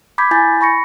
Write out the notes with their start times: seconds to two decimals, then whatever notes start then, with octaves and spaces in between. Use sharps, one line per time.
0.18 B5 D6 G6 G#6 B6
0.31 E4 G#5 G6 A6
0.61 B5 C#6 A#6 C#7